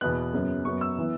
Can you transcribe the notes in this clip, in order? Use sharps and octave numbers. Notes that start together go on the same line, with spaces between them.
E2 B2 B3 F#6
F#2 C#3 F#3 B3
F#2 F#3 B3 C#6
E6
E3 B3